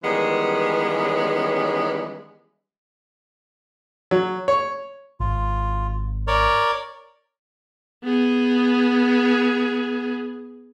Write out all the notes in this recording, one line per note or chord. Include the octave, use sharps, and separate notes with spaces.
D#3 E3 G3 G#3 B3 C#4
F#3
C#5
G#1 F4
A#4 C#5 D5
B3 G#4